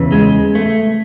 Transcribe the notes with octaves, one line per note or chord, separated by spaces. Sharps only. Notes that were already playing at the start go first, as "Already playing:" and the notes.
Already playing: E2 C#3 E3
G#3
A3